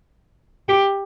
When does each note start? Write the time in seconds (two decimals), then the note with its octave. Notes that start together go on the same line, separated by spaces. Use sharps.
0.69 G4